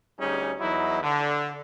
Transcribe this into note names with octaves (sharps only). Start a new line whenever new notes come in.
D2 G3 C#4 D#4 G#4
E2 F#3 D#4 E4
D3